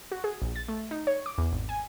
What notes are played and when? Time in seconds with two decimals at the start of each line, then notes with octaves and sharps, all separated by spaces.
0.12 F#4
0.24 G#4
0.42 A#1
0.56 A6
0.68 A3
0.91 D#4
1.07 C#5
1.26 D6
1.38 E2
1.52 G#1
1.69 G#5